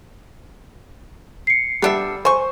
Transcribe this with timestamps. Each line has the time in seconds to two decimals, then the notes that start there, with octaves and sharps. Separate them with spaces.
1.47 C7 C#7
1.82 G3 B3 D4 E5
2.25 C5 G#5 C#6